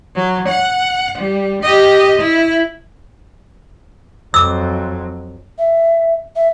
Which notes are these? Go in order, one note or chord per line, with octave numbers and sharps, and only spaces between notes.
F#3
F#5
G3
G4 D#5
E4
F2 F#3 D6 E6
E5
E5